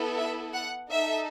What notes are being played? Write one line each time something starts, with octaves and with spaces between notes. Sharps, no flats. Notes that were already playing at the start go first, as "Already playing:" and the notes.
Already playing: B3 E4 A4
E5
F#5
D#4 A4 E5